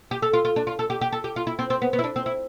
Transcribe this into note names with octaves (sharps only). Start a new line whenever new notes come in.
G4
A4
F4
F4
D4
F4
A4
G4
G4
A4
G4
F4
E4
C4
C4
B3
B3
E4
D4
C4
E4